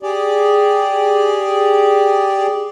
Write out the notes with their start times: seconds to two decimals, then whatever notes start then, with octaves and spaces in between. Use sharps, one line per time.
0.03 G4 G#4 D5